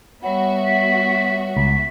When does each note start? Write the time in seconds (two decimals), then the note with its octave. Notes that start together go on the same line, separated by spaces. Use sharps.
0.23 G3 B3 F#4 C#5 E5 F#5 B5
0.66 B6
1.57 C#2 B6